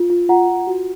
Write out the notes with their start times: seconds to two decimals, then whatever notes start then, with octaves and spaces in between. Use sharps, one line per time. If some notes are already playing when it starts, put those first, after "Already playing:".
Already playing: F4
0.10 F4
0.29 F4 F#5 A#5
0.48 F4
0.67 F#4